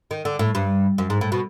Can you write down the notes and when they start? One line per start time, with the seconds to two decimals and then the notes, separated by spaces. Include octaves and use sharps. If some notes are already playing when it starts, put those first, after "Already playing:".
0.11 D#3
0.25 D3
0.39 A2
0.55 G2
0.98 F#2
1.10 G#2
1.21 A2
1.32 B2